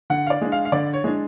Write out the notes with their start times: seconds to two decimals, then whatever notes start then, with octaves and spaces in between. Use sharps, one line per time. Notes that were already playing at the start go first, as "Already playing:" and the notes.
0.10 D3 F#5
0.26 F5
0.30 D5
0.41 G#3 D4
0.52 F5
0.65 F5
0.72 D3 D5
0.94 C#5
1.04 G#3 D4